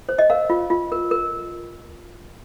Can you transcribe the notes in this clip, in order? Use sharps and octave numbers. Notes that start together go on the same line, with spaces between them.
C5
D#5
A#4 F5
F4
F4
A#4
A#4